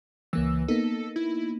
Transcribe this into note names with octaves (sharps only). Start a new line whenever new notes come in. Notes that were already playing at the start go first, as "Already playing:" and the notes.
C#2 E3 A#3 E6
A#3 B3 D#4 A4
E4